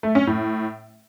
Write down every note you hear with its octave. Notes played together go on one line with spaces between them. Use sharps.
A3
C#4
A2